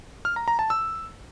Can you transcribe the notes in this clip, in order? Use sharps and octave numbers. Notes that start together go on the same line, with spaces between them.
F6
A#5
A#5
A5
E6